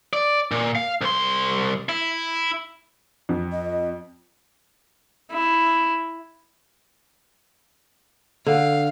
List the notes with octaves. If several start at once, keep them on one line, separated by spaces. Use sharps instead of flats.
D5
A#2
F5
C2 C6
E4
F2
D#5
E4
D3 F5